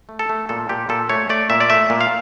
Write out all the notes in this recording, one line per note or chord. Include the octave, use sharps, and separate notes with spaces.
A3
A4
A3
A#2 A4
A#2 G4
A#2 A4
A3 C#5
A3 D5
A#2 E5
D5
A3 E5
A#2
F5